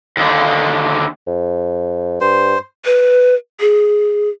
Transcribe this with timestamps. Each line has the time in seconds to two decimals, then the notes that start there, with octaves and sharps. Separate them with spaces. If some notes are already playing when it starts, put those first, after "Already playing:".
0.17 D#2 D3
1.27 F2
2.21 G2 C5
2.85 B4
3.60 G#4